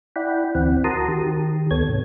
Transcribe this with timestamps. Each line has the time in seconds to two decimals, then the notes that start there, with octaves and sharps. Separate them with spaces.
0.16 E4 D5 F#5 G5 B5
0.55 D2 E3 C4 F#5
0.84 F#4 A#4 A5 A#5 C6 D#6
1.08 D#3 G4
1.71 D2 B3 A4 C#5 G#6
1.88 G#2 C3